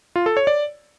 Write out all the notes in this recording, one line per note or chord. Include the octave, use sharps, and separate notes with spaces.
F4
A4
C#5
D5